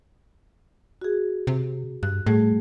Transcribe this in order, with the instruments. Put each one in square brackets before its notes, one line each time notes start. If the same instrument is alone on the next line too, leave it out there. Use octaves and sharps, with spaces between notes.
[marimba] F#4 G#4
[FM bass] C3
[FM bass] G2 [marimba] F#6
[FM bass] A2 [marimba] G3 A3 G#4